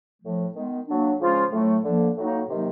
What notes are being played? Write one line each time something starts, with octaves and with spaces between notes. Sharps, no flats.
A2 F3 A3
D#3 G#3 B3
F#3 A#3 D4
C#3 F3 G#3 C#4 F4
A2 F#3 A3
D3 F3 A#3
A2 F#3 A#3 D#4
C3 D#3 F#3 A#3 D#4